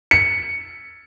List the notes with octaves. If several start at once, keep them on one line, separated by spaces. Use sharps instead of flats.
C#7